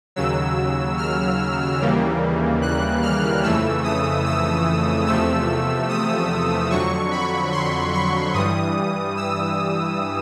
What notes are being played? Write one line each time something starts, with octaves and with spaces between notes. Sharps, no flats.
D#2 C#3 F#3 E6
F6
D#2 C#3 E3 G3 A#3
F#6
F6
F2 C#3 E3 A3 E6
D#6
E6
E2 C3 F3 A3 E6
D#6
F2 D3 F#3 C#6
B5
C6
C#6
G2 E3 G3 D#6
E6